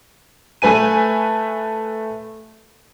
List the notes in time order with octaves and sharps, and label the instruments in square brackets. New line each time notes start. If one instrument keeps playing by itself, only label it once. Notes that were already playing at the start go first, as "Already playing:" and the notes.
[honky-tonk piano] A3 B4 G#5 D#7